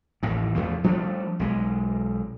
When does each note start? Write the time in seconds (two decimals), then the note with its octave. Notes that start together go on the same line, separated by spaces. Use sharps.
0.23 A1 D#2 A2
0.55 E2 F3 A3
0.84 F3 G3 A3 D4
1.39 B1 G#3